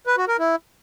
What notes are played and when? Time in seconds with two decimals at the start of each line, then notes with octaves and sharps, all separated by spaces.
0.07 B4
0.17 F#4
0.28 A#4
0.39 E4